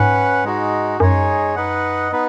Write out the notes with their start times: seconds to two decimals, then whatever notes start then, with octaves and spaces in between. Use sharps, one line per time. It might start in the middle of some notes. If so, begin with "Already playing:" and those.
Already playing: G#2 C#4 B4 F#5
0.44 G#3 D#4 F#4
1.00 F#2 G#3 D#4 G#4 C#5
1.56 D#4 B4 D#5 F#5
2.12 B3 D#4 B4